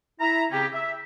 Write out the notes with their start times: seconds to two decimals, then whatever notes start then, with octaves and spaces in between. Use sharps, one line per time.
0.20 E4 E5 A#5
0.51 C#3 C4 C#4 G4
0.73 E5